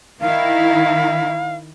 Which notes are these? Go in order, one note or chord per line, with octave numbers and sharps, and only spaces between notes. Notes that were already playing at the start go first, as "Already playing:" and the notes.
D#3 E4 F5